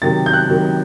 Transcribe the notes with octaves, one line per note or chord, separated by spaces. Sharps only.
C3 D#3 F#3 A6
G6
F#6
C3 D#3 F#3